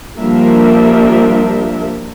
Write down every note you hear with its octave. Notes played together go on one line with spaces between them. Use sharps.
F3 G3 A#3 D4 A#4 E5